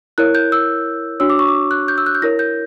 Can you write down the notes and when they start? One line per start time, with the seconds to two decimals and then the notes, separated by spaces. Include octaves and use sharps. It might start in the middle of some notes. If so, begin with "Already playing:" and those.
0.18 E4 A#4 C#5 F#6
0.35 G6
0.52 E6
1.20 D4 F#4 C#5 E6
1.30 D6
1.39 C#6
1.48 D6
1.71 F#6
1.88 G6
1.98 E6
2.06 F#6
2.15 G6
2.22 E4 A#4 C#5 A#6
2.39 G6